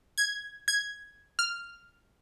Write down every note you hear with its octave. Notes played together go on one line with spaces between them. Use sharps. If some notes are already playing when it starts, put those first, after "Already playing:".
G#6
G#6
F6